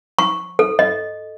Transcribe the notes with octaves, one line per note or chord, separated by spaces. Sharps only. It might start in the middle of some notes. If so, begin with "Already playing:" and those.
C#6
A4
D#5